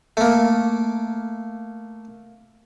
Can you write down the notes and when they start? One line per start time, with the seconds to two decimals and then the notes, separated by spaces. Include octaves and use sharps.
0.17 A3 A#3